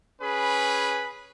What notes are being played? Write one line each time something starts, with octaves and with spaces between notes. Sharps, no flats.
C#4 G#4 B4 B5